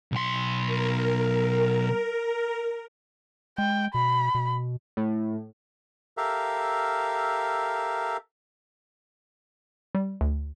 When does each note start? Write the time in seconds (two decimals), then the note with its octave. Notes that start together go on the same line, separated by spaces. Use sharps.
0.12 B1 C6
0.67 A#4
3.58 G#3 G5
3.94 B2 B5
4.35 B2
4.97 A2
6.17 G4 A4 A#4 E5 F5
9.95 G3
10.21 D2